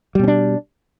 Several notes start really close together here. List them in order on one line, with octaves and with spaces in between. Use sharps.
G3 B2 C#4 D4